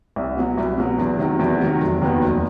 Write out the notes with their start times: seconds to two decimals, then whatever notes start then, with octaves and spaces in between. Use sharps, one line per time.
0.16 C2
0.37 B2 F#3
0.58 C2
0.78 B2 F#3
0.98 E2
1.19 C3 D#3 F#3
1.39 E2
1.60 C3 D#3 F#3
1.81 F1
2.02 D#2 D#3 F#3 B3
2.22 F1